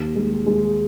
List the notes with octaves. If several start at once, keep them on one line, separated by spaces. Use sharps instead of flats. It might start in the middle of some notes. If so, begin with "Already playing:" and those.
Already playing: D#2 D#3
G#3
G#3